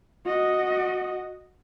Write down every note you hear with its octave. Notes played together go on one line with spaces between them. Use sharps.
F#4 D#5